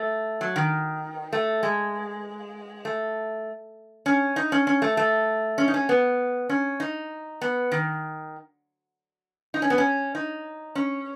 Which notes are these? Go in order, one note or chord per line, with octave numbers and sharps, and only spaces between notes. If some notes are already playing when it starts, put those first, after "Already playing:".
Already playing: A3
F#3
D#3
A3
G#3
A3
C#4
D#4
C#4
C#4
A3
A3
C#4
D#4
C#4
B3
C#4
D#4
B3
D#3
D#4
C#4
B3
C#4
D#4
C#4